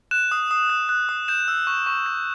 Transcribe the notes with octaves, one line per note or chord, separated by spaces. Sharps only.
F#6 E7
D#6
D#6
F#6
F#6
D#6
G6 E7
E6
C#6
C#6
G6